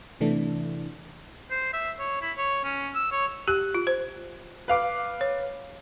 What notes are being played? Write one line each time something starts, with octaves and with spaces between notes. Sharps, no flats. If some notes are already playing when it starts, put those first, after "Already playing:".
C3 E3 A3 D4
C5
E5
C#5
E4
C#5
C#4
E6
C#5
G4 F#6
F4
C5
B4 F5 D6
C#5